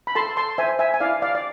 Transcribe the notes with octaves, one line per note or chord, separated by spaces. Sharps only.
B5
A4 A5 C6
A5 C6
C5 E5 G#5
E5 G#5
G#5
E4 D5 F5
D5 F5
D5